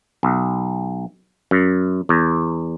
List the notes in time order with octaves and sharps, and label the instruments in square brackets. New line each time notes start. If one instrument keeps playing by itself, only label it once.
[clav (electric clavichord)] B1
F#2
E2